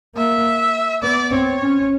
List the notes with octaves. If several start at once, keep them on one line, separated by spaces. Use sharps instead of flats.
A#3 E5
B3 D5
C4 C#5
C#4